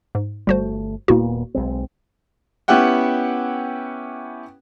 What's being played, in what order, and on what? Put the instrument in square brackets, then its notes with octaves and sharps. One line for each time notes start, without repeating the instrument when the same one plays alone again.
[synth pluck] G#2
[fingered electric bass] G1 A3 [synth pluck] G3 F#4 C5
[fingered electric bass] D#1 A#2 B3 [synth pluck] A#3 E4 F#4
[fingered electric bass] B1 G#3 C4
[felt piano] B3 C#4 E4 G4 F#5 G5